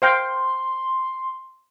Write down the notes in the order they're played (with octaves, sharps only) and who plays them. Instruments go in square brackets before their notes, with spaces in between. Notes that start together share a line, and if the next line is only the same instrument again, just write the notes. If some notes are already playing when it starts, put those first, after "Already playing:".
[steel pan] C5 F5 G5 [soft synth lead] C6